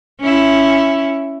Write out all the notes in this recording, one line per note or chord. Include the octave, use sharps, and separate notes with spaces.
C#4 E4